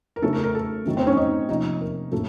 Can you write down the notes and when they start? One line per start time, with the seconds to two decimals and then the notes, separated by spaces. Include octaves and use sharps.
0.16 A#4
0.22 C#3 F#3 A3 C#4 A4
0.33 A#4
0.44 A#4
0.55 A4
0.86 D#3 F#3 A3 C#4
0.97 C4 C5
1.07 C#4 C#5
1.17 D#4 D#5
1.49 C3 F3 A#3 C#4 D#4 D#5
1.81 A#4
2.12 A2 F#3 A#3 C#4 A4